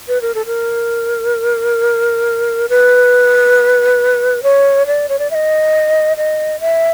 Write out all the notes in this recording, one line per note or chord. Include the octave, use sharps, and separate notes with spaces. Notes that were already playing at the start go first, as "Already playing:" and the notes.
B4
A#4
A4
A#4
B4
C#5
D5
C#5
D5
E5
D#5
D#5
E5